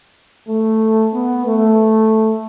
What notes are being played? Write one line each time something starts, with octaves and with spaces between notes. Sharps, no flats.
A3
B3
A3